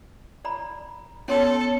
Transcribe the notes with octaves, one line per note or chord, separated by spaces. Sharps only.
D5 A#5 B5
B3 C#4 A4 C#5 A5 C6